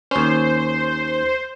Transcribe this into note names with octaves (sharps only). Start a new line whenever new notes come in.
D#2 C#4 C5